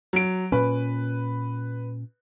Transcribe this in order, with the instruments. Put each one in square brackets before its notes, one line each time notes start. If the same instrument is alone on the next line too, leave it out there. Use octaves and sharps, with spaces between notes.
[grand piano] F#3 D7
[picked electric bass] A#2 C#4 [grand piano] B4